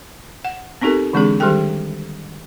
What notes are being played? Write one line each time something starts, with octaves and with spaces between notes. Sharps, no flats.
F#5
B3 C4 D#4 G4 A4 A#4
D3 E3 G#3 C4 D4 G#4
D#3 G3 G4 A4 G5